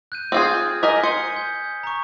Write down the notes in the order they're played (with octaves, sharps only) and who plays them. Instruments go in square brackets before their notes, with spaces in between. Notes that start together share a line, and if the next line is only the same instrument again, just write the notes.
[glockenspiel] F#6 G6 D#7
[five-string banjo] C4 F4 G#4 [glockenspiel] D#6 F6 G#6
[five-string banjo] A#4 D#5 G#5 [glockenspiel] B6
[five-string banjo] C5 [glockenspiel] G#5 C#7 G7
[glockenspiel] G6
A#5 C#6